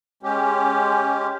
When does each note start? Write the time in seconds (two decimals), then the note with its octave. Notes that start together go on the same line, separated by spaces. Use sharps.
0.23 G#3 C#4 G4